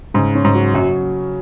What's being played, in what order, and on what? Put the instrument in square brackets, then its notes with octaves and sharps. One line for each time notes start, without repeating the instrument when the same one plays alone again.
[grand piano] G#2 [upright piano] C#3
[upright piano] C#4
[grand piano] G#2
[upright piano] F#3
[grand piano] F#2 [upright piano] F#3